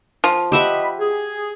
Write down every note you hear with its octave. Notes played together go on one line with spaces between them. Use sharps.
F3
G4 D#5 E5 F#5 B5
G#4